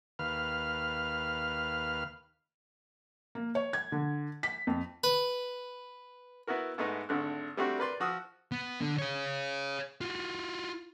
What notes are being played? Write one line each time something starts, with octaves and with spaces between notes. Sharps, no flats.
D#2 B4 F5 F6
A#3
C#5
G#6
D3
B6
F2
B4
B3 E4 F#4 A#4
G#2 A3 B3 D#4
G#1 D3 A3 F#6
G3 A3 C4 D4 F#4
A#4 B4 D5 C6
F3 F#4 D#6 E6
B3
D3
G#4 C#5
F4 F#4